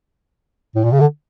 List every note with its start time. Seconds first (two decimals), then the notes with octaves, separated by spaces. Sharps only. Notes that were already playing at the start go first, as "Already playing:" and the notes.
0.76 A2
0.84 A#2
0.92 C#3
1.00 D3